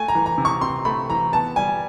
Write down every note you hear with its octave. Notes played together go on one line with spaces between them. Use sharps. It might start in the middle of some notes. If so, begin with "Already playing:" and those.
Already playing: A3 G#5
A#5
E3
A#5
C3
C#6
C4 C6
A3 B5
E3 A#5
B3 A5
G3 G#5